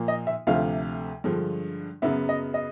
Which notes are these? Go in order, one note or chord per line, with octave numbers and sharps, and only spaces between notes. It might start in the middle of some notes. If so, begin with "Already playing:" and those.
Already playing: A#2 F3 A#3
D#5
E5
D2 C3 F3 A3 F5
G2 D3 F3 G#3
F#2 C#3 F#3 B3 E5
D#5
D#5